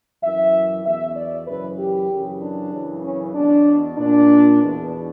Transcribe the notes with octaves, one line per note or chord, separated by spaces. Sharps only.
F#2 E3 E5
E2 B2 E5
D5
F#2 C#3 E3 B4
G4
F#2 C#3 E3
D4
F#2 C#3 E3
C#4
E2 B2 D4
A#2 D4
E2 B2